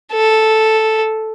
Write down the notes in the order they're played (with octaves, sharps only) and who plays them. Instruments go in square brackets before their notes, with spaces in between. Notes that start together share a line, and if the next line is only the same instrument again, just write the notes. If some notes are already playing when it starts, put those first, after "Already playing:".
[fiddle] A4